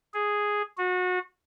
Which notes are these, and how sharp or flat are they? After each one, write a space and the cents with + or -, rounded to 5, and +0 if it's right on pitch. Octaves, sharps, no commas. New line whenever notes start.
G#4 +0
F#4 -30